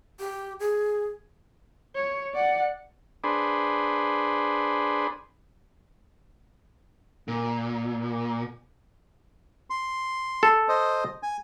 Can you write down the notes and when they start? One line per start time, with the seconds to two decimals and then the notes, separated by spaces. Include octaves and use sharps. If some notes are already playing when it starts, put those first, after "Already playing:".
0.20 G4
0.60 G#4
1.96 C#5
2.34 D5 F#5
3.24 D4 G#4 B4 C5
7.28 A#2
9.70 C6
10.43 A4
10.69 C5 D#5
11.23 G#5